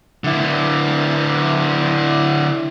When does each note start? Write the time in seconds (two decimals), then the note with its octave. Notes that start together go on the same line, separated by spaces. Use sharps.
0.24 D3 E4